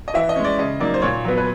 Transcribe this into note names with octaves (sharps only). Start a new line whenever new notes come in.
D#5
E3 E5
D#5
G#3 C#4
D5
C#3 D#5
F#3 A#3 D#4 D5
C5
A#2 C#5
F#3 B3
B4